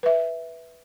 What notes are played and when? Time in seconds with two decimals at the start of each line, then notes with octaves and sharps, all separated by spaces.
0.03 B4 E5